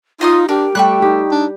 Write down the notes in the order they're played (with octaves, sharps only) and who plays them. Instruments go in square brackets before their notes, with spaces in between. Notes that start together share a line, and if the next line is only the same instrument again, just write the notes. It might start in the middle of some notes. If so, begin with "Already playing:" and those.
[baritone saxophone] D#4 [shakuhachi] F4 [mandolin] D#5 C6 D#6
[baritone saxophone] D4 [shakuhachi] G4 [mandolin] A#4
[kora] G3 [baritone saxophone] A3 [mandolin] G5 C#6 F#6
[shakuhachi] D#4 [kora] G4
[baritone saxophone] D4